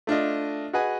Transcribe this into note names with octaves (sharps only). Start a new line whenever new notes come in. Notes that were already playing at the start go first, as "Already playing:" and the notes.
A3 D4 F4 D#5
F#4 G#4 B4 D#5 F#5 G#5